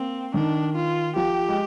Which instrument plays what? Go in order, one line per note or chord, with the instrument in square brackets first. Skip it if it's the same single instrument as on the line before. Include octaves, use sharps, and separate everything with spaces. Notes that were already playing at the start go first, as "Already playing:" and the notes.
Already playing: [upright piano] A#3 [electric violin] C4
[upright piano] D#3 [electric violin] D4
[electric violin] F4
[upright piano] F3 [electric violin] G4
[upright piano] G#3